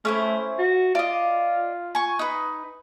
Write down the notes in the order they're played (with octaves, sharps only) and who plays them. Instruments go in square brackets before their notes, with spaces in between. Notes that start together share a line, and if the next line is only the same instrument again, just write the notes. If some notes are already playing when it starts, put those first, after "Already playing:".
[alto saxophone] A3 [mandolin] C#4 E4 C5
[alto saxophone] F#4
[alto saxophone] F4 [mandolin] D5 D#5
[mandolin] G#5 C#6
D#4 B4